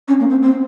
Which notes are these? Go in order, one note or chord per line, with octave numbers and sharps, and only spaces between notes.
C#4
A#3
C4
C4